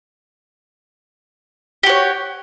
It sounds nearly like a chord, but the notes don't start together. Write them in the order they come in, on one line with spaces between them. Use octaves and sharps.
G4 F#4 C#5